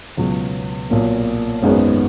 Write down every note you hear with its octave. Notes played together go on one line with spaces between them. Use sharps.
C#2 B2 F#3 B3
B1 A#2 A#3
G#1 F#2 D#3 G#3 B3